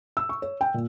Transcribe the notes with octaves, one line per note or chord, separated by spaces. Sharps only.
E6
C#6
C#5
G5
A#2